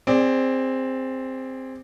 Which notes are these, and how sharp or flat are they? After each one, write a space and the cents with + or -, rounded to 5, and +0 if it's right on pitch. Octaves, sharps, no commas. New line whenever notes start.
C4 +0 G#4 -25 D5 +0